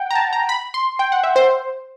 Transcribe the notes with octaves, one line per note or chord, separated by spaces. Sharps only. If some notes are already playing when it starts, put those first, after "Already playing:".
Already playing: F#5 G5
A#5
A5
A#5
B5
C6
G5
F#5
E5
C5